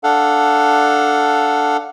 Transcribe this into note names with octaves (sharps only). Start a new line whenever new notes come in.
D4 A4 F5 F#5